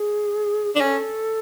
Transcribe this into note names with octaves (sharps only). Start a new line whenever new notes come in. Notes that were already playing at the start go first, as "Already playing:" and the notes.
Already playing: G#4
D4 A#4
C#4 A4